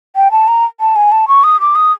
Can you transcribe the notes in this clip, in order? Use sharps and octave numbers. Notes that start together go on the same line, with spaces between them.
G5
A5
A#5
A5
G#5
A5
C#6
D#6
D6
D#6